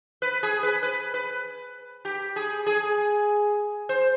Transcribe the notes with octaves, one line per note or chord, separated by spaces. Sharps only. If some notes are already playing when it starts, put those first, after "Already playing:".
B4
G#4
B4
B4
B4
G4
G#4
G#4
C5